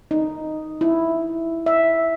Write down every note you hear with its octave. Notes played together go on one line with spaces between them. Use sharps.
D#4
E4
E5